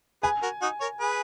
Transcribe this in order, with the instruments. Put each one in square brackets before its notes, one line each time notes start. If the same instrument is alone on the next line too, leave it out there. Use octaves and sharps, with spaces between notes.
[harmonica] G#4 B4 [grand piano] G#5
[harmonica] F#4 A#4
D#4 F#4
A#4 C#5
G#4 B4